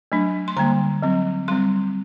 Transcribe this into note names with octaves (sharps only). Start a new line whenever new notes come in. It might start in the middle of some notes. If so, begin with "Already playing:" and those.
F#3 A3 D4
C6
D3 G3 A#3 A#5
F#3 C4
G3 C4 C6